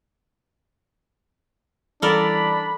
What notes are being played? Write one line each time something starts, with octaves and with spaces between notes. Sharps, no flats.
E3 G3 D4 E4 A4 A#4 D5 B5